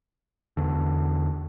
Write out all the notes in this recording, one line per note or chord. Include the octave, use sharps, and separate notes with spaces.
E2 D3